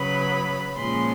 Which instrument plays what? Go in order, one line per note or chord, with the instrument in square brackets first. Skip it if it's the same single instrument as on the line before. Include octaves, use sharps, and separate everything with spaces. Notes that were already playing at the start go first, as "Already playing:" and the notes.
Already playing: [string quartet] C#3 F#3 B3 B5
A#2 F3 G#3 C#4 C6